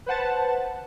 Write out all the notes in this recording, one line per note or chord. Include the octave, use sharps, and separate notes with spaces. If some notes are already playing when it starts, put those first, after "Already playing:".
B4 C5 F#5 A5